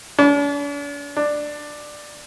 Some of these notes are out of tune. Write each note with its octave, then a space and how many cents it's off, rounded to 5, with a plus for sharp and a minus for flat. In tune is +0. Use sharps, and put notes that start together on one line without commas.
D4 -45
D4 +10